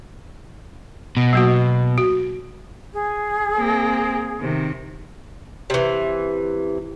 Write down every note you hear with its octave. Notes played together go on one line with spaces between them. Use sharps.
B2
F#3 A#3 F#4
F#4
G#4
A#3 C4
C3 D#3
C3 E3